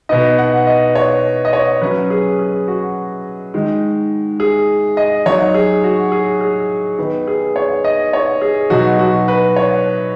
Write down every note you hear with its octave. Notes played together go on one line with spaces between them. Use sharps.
B2 B3 D#4 D#5
F#5
D#5
C#5
D#5
C#5
F#3 C#4 B4
G#4
G#4
F#4
D#3 G#3 D#4
G#4
D#5
F#3 D#4 C#5
G#4
F#4
G#4
G#4
D#3 B3 D#4
G#4
C#5
D#5
C#5
G#4
B2 F#3 D#4 F#4
F#4
B4
C#5